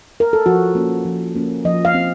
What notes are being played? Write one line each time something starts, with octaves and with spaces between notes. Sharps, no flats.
A#4
A4
F3 F#4
A#3 C#4
F3
A#3 C#4
F3 D#5
F5
C4